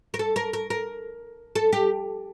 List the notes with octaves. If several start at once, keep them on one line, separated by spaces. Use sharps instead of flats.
A#4
A4
A#4
A#4
A#4
A4
G4